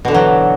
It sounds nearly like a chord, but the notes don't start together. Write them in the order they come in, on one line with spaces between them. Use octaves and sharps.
B2 D3 E3 F#3